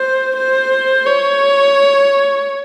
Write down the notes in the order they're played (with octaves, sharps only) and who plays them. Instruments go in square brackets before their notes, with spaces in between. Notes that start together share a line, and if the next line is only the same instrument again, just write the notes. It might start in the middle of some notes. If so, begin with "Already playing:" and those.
Already playing: [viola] C5
C5
C#5